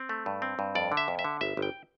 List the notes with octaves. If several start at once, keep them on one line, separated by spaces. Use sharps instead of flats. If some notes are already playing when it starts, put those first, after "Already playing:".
Already playing: C4
A3
G2
C4
G2
F2 D5
D3
E5
F2
E5
D3
G1 E5
G1
G5